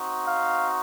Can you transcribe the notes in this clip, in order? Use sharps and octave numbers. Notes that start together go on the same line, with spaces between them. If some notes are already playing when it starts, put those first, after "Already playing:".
Already playing: C4 D#4 F#4
F5